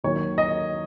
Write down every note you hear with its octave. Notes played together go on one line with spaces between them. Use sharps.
D#2 D#3 F#3 C#5
D#5